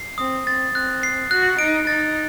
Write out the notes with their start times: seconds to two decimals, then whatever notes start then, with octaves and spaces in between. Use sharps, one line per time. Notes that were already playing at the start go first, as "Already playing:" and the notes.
Already playing: C7
0.18 C4 D#6
0.46 C4 A6
0.74 C4 F#6
1.03 C7
1.31 F#4 F#6
1.59 D#4 D7
1.87 D#4 A6